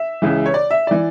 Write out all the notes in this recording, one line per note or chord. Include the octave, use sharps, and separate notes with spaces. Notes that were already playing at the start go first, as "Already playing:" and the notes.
Already playing: E5
C#2 C#3 E3
C#5
D5
E5
E3 D5